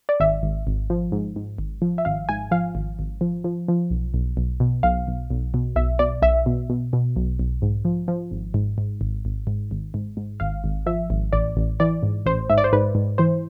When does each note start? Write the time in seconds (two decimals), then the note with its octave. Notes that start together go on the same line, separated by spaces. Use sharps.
0.09 D5
0.20 G#1 E5
0.43 G#1
0.67 G#1
0.90 F3
1.12 G#2
1.36 G#2
1.58 G#1
1.82 F3
1.98 E5
2.05 G#1 F5
2.29 G#2 G#5
2.51 F3 F5
2.75 G#1
2.99 G#1
3.21 F3
3.44 F3
3.68 F3
3.90 B1
4.14 B1
4.37 B1
4.60 B2
4.83 B1 F5
5.08 B1
5.30 B1
5.54 B2
5.76 B1 E5
5.99 B2 D5
6.22 B1 E5
6.46 B2
6.70 B2
6.93 B2
7.16 B1
7.39 B1
7.62 G#2
7.85 F3
8.08 F3
8.31 G#1
8.54 G#2
8.78 G#2
9.01 G#1
9.25 G#1
9.47 G#2
9.71 G#1
9.94 G#2
10.17 G#2
10.40 G#1 F5
10.64 G#1
10.86 F3 E5
11.10 G#1
11.33 A1 D5
11.57 A1
11.80 E3 D5
12.03 G#2
12.26 A1 C5
12.50 G#2 E5
12.58 D5
12.64 C5
12.73 G#2 B4
12.95 G#2
13.18 E3 C5